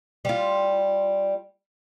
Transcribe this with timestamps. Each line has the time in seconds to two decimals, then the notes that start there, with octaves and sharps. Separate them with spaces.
0.25 G3 F4